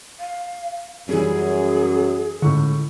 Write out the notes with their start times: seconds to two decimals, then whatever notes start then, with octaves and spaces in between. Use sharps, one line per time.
0.20 F5
1.09 F#2 E3 G3 G#4
2.42 C#2 A2 D3 C#6